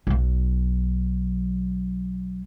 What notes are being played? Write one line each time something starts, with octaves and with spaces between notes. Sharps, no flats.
B1 F#3